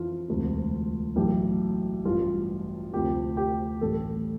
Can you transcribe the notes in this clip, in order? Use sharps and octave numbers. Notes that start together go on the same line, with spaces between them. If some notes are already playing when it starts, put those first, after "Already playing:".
Already playing: F2 E3 F4
E1 D2 C3
B1 A2 E3 G4
A1 G2 E3 G3 F4
D2 C3 F3 G4
G4
A1 A2 G3 A4